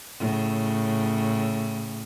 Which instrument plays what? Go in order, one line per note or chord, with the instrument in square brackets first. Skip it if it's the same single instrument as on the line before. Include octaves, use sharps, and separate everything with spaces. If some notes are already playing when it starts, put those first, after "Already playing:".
[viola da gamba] A2 C#3